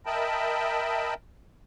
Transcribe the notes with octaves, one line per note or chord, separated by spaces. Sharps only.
A#4 D#5 E5 G5 A5 B5